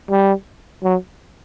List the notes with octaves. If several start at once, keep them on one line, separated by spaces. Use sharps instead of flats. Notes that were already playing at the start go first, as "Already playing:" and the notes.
G3
F#3